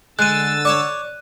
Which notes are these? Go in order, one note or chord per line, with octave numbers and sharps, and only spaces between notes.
D3 G#3 E6 F#6 A6 D#7
C#5 D5 A5 C#6 D6